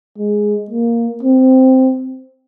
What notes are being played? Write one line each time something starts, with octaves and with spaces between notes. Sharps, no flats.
G#3
A#3
C4